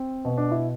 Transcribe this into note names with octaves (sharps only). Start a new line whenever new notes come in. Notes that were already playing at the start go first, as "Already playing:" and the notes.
Already playing: C4
B2
D4
E4